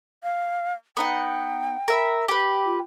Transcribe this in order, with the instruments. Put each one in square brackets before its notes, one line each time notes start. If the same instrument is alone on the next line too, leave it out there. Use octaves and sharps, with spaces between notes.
[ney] F5
[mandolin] B3 D#4 F#5 [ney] G5
[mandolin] A#4 E5 B5
G4 B4
[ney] F4